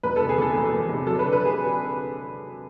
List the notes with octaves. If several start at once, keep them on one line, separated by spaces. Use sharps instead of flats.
E1 B4
C3 A4
G#4
E2 A4
E1
E1
C3
F#3 A4
B4
D3
B4
G#4